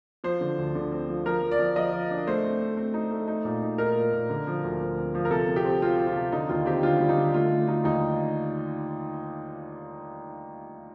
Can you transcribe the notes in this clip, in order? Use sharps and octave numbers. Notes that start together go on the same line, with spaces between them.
F3 C5
D3
D2
D3
C4
F3
F3 A#4
F3
D5
F3
F3 D#5
F3
D4
A3 C5
C4
A3
C4
D#4
A3
D#4
A#2
D#4
D#4 A#4
A#2
A#2
D3
F3
D2
F3
C4
F3
A#4
C3 A4
C3
G4
C4
C4 F4
C4
F4
C3
D3 D#4
D#2 F4
C4 G4
D3 F4
G3
D#4
D3
A3 F4
A3
D#4 F4
D#2 D#4